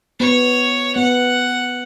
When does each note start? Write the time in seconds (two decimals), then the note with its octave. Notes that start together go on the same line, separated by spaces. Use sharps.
0.20 B3 C#5
0.96 B3 F#5